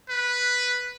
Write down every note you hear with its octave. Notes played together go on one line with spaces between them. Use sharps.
B4